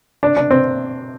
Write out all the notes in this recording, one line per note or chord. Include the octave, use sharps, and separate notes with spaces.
D4
D4
C4